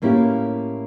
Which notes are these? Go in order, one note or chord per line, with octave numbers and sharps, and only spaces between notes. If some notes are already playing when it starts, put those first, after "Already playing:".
A2 A#3 C#4 E4 G4